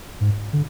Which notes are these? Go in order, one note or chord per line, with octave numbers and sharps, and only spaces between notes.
G#2
D3